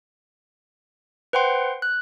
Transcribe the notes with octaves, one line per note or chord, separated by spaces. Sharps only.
B4 C5 F#5 G5 C6
F#6